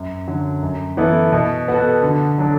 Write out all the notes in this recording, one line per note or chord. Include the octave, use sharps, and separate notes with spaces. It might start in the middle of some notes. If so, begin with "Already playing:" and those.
Already playing: F#2
D3 F#3
F#2
E3 B3 E4 A4
B2
B3 F#4 A4
D3
F#3 D4 A4